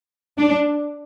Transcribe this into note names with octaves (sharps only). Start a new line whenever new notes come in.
D4